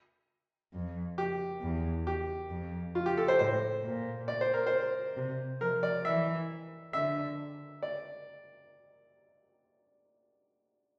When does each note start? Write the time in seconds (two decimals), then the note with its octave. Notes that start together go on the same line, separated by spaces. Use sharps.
0.74 F2
1.18 G4
1.62 E2
2.07 G4
2.51 F2
2.95 F4
3.06 G4
3.17 A4
3.28 C5
3.39 A2 C5
3.84 A#2
4.28 D5
4.41 C5
4.54 A#4
4.67 C5
5.17 C3
5.60 F3 A#4
5.83 D5
6.05 E3 E5
6.93 D3 E5
7.83 D5